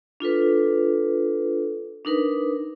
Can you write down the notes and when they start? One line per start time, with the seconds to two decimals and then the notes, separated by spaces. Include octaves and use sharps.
0.20 D4 F4 A4 B4
2.05 D4 D#4 A#4 B4